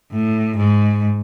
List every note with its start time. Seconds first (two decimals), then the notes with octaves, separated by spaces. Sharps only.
0.11 A2
0.57 G#2